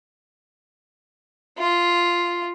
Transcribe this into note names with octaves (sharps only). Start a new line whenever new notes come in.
F4